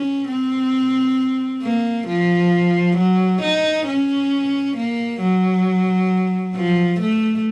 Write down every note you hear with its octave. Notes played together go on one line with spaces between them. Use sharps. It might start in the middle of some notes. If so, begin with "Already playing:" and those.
Already playing: C#4
C4
A#3
F3
F#3
D#4
C#4
A#3
F#3
F3
A3